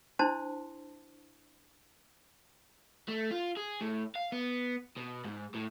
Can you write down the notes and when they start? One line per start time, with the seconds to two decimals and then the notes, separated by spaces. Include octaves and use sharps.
0.19 D4 E4 C5 A5 C6
3.09 A3
3.31 F4
3.57 G#4
3.81 A2
4.15 F5
4.32 B3
4.97 B2
5.25 G#2
5.55 A2